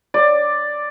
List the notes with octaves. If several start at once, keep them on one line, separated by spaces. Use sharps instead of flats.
D5